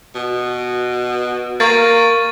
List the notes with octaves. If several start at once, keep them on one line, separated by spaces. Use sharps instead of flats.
B2
A#3 C#6 A6